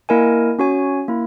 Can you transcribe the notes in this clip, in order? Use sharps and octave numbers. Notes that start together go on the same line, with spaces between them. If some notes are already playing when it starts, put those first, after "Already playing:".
A#3 E4 A#4 D#5 G#5
C#4 F#4 C#5 G#5
A#3 E4